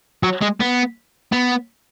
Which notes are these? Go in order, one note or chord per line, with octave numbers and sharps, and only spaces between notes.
F#3
G#3
B3
B3